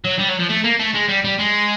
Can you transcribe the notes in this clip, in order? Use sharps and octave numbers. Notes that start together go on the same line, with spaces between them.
F#3
G3
F#3
F3
A3
A#3
A3
G#3
G3
G3
G#3